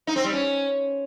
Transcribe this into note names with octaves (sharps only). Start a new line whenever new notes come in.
D#4
C4
G3
C#4